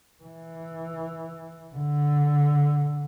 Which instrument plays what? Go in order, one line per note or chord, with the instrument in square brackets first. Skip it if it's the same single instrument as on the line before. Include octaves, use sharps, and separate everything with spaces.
[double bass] E3
D3